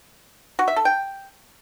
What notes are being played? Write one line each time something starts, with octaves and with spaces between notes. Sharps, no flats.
F#4
E5
A4
G5